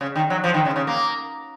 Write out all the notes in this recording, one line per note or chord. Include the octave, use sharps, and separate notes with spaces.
C#3
D#3
F#3
F3
D#3
C#3
C#3
A#3